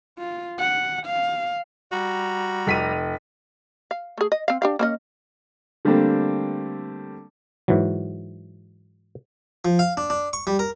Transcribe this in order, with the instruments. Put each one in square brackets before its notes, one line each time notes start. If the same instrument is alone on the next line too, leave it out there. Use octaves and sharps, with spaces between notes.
[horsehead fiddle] F4
F#5
F5
[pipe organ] G3 A#5 [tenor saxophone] F#4
[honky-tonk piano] F1 B6 D#7
[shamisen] F5
A3 G#4
D#5
C4 F5
D4 G4 F5
A#3 C#4 D#5
[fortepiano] D3 G3 A3 A#3 C4 D4
[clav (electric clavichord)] G#2 E3 F#3
[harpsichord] F3
F5
D4
D4
C#6
G3
A#4